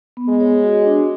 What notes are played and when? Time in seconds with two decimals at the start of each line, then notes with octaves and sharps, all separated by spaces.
0.17 B3
0.29 G#3
0.40 C#5
0.63 F#4
0.86 D4